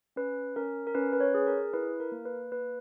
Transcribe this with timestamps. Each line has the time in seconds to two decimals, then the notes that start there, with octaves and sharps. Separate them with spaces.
0.16 C#4 B4
0.56 C#4 A#4
0.87 A#4
0.95 C#4 B4
1.13 B4
1.20 C#5
1.34 G#4
1.47 A#4
1.73 E4 B4
2.00 A#4
2.12 A#3
2.25 B4
2.52 A#3 B4